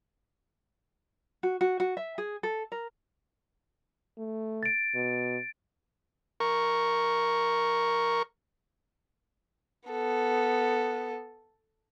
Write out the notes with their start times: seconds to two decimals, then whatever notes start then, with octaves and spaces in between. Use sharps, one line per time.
1.43 F#4
1.61 F#4
1.80 F#4
1.97 E5
2.18 G#4
2.43 A4
2.72 A#4
4.18 A3
4.63 A6 D7
4.95 B2
6.40 A#4 C#6
9.89 B3 A4